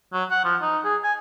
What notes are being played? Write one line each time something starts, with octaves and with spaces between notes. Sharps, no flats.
F#3
F#5
F3
D#4
G#4
G#5